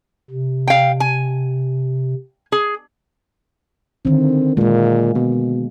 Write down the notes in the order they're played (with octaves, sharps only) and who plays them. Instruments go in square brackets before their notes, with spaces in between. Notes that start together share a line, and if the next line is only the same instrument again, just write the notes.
[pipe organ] C3
[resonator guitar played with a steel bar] F5 G5
G#5
G#4
[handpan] D3 D#3 [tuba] C4
[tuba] A#2 [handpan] G#3 A#3
[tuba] B2